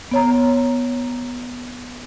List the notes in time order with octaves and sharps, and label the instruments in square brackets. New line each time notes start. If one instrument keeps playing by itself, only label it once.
[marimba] B3 C#5 A#5